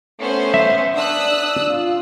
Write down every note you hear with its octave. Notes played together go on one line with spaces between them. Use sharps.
A3 B3 C#4 C5
E5
D4 D#6 E6 F#6
D4
F4